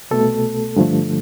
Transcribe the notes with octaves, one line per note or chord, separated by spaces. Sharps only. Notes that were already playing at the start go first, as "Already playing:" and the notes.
C2 B2 A3 A4
G2 D3 F3 A3